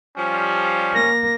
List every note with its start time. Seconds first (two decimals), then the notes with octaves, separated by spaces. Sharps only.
0.18 F3 G3 C#4
0.94 A#3 A#6